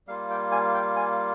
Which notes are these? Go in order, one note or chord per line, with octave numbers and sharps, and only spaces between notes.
G3 A#3 F4 F5
G5
G#5
G5
G#5